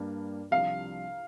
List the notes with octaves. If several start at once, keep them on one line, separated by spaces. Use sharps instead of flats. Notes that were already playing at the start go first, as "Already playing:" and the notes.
Already playing: G2 G3 A#3 D4
C2 C3 F3 D4 F5